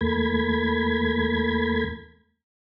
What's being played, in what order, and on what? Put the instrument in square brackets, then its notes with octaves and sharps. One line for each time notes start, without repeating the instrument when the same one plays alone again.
[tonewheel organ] E2 A3 A#3 B5 G#6